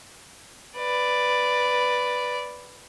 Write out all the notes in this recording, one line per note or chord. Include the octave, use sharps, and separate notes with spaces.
B4 D5